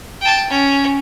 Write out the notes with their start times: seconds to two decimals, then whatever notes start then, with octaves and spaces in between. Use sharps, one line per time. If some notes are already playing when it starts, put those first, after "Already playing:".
0.21 G5 A5
0.49 C#4